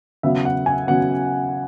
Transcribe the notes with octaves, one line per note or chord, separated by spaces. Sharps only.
C#3 F#3 B3 E5
F#5
G#5
C#3 F#3 B3 F#5